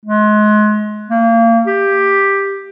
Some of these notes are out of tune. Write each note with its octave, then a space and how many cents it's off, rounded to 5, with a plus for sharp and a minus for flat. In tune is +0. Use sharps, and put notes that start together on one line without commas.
G#3 +30
A#3 -30
G4 +5